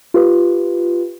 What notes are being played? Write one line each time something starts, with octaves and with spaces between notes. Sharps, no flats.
F4 G4 B4